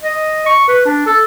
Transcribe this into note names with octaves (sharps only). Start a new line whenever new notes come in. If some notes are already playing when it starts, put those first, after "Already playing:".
D#5
C#6
B4
D4
A4